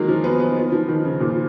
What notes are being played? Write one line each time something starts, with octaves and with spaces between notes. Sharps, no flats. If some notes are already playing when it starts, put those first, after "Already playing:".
Already playing: D#3 F#3 G#3 A#3
F3
B3
B3
B3
F3
D#3
C#3
A#2